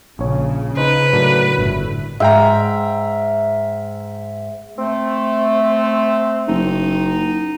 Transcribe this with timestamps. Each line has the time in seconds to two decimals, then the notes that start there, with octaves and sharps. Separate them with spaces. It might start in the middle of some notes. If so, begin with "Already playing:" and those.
0.19 A#1 C#3 C#5
0.77 D#4 B4 C5
1.13 A2 F#3 D4 A#4
1.58 G1 A2
2.20 G#2 E5 F5 G5 A#5
4.78 A3 C4
6.48 F#1 D#4